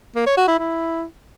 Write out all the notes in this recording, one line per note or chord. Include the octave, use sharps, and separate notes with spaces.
A#3
C#5
F#4
E4
E4